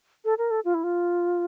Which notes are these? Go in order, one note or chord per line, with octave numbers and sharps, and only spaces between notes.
A4
A#4
A4
F4
E4
F4